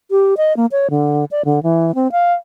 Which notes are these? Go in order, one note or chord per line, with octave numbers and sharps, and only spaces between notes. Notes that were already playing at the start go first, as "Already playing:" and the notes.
G4
D#5
A#3
C#5
D3
D5
D3
E3
C4
F5